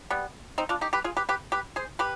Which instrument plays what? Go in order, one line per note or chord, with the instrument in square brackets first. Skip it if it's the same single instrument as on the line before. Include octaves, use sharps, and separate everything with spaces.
[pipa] G3 B3
C4 D#4
D4 F4
D#4 G4
G4 B4
F4 G#4
G4 B4
G4 B4
G4 B4
G#4 C5
G4 B4